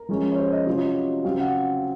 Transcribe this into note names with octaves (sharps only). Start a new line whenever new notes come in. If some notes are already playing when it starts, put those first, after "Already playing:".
Already playing: A#4
F3 G#3 C#4
C#5
C5
D#5
C3 F#3 C#4 F4 C#5
D#5
C#3 F#3 C4 F5
F#5